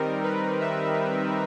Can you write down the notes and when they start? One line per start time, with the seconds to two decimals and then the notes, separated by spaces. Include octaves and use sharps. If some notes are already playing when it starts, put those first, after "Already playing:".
Already playing: D#3 G3 C4 D#4 A#4
0.23 B4
0.60 E5